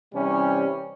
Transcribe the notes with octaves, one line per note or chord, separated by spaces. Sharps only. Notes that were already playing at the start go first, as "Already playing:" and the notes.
C3 E3 G3 C#4